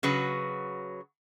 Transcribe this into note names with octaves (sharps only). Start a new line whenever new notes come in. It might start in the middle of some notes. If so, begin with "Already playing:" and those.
C#3 F#3 F#4 B4